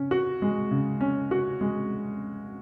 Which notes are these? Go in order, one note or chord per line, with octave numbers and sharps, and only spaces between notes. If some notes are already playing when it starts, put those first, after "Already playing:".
Already playing: C#3 C#4
F#4
G#3
C#3
C#4
F#4
G#3